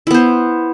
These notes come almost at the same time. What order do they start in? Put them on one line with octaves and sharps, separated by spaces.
E4 B3 C5